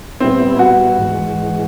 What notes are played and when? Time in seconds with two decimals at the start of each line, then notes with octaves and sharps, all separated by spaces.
0.20 A#2 G3 B3 C4 E4
0.59 F#4
0.98 G#2 E3 G#3